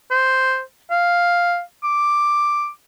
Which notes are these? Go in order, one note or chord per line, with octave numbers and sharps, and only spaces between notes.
C5
F5
D6